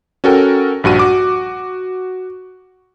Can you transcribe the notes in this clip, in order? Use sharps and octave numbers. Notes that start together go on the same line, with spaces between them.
C#4 F#4 A4 A#4 G5
A#1 G2 F#4 D#7
F#4 D6